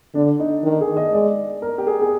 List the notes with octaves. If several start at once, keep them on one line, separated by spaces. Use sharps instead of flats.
D3 D4
D#4
D#3
G#4
D#5
G#3 D5
A#4
G4
G#4
G#4